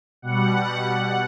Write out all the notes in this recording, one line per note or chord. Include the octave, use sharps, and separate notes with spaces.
B2 G3 F#5